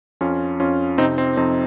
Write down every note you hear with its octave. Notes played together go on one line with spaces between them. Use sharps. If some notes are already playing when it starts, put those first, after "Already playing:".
F2 C#4 F4
F2 C#4 F4
C3 C4 D#4
C4
F2 C4 D#4